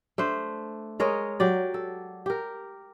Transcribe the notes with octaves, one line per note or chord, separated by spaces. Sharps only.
A3 D4 C5
G#3 A#4 C#5 D#5
F#3 G4 D5
A4
G4 A#4